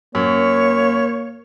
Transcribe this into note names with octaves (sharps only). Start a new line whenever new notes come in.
F#2 A#3 C#5